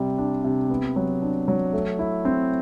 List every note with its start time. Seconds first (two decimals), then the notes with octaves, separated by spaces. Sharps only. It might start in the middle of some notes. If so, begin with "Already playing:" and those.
Already playing: C3 G3
0.18 D4
0.44 C3
0.70 B3
0.96 F#3
1.21 D4
1.48 F#3
1.73 A3
1.99 E4
2.25 C4